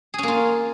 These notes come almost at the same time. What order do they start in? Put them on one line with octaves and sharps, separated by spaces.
G#4 C#4 A#3 F4